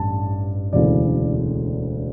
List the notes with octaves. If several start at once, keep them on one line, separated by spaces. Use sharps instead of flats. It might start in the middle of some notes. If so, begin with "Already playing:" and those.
Already playing: A1 G2 A5
E1 D2 C#3 E3 D5